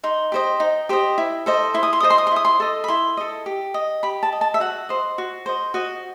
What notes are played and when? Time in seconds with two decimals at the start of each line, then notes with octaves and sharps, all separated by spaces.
0.03 D#4 C6
0.32 G4 C5 D#5
0.60 D#4
0.89 G4 C5 D#5
1.18 E4
1.46 A4 C5 D#5
1.74 E4 C6
1.83 D#6
1.93 C6
2.00 A4 C5 D#5 D#6
2.10 C6
2.18 D#6
2.27 C6
2.32 E4 D#6
2.45 C6
2.60 A4 D#5
2.84 B5
2.88 E4 C6
3.17 A4 D#5
3.46 G4
3.74 D#5
4.03 G4 B5
4.23 A5
4.33 D#5
4.41 A5
4.54 E5
4.60 F#4 F#5
4.89 C5 D#5
5.18 F#4
5.46 C5 D#5
5.74 F#4 D#5